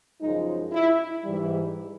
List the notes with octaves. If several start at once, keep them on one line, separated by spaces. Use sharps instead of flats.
F#2 C#3 F3 G#3 D#4
E4
G#2 E3 G3